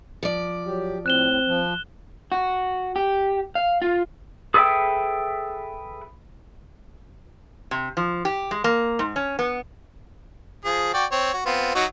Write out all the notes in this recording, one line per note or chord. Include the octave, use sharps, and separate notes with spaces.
F3 D5
F#3 G4
A2 C4 F#6 E7 G7
F3
F#4
G4
F5
F4
G#4 A4 B4 D5 E5 G5
C3
F3
G4
G#3
A#3
G#2
C#4
B3
F3 G#4
F#4 D5 G5
C4 C#5
F#4
B3 C4 F4
F#3 D#4 F#4